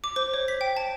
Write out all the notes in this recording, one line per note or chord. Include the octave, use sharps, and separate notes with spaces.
D6
C5
C#5
B6
G5
A5